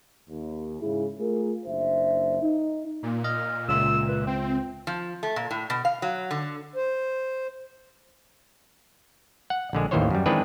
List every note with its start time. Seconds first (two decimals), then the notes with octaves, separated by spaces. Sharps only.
0.29 D#2
0.81 G#2 C#3 E4 G#4
1.19 A3 F4 G#4 A#4
1.66 F#1 D4 C5 E5
2.42 D#4
3.03 A#2 A#3
3.24 D#5 F6
3.69 C#2 F4 E5 E6
4.08 B4
4.27 C4 G5
4.87 F3
5.23 A3
5.36 A#2
5.51 A2
5.70 B2
5.85 F5
6.02 F#3
6.31 D3
6.76 C5
9.50 F#5
9.73 A#1 D3 G#3
9.91 A1 D#2 D#3 E3 C5 C#5
10.11 F#2 G3
10.26 D#3 E3 G#3 C4 D4 B4